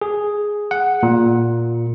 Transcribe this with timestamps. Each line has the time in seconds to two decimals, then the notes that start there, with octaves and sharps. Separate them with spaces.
0.02 G#4
0.71 F#5
1.03 A#2